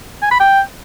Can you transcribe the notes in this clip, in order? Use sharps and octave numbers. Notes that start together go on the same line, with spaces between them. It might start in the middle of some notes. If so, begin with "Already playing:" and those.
G#5
B5
G5